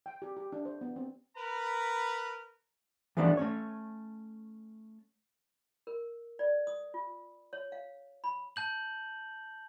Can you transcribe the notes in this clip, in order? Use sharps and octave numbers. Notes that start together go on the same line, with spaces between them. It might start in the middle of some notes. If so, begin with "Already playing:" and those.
G5
G4
G4
D4
C5
B3
C4
A#4 B4 A#5 B5
E3 F3 G3 A3 B3 D4
A3 C#4 C#5
A#4
D5
D#6
F4
C#5
F5
B5
A5 G6 F#7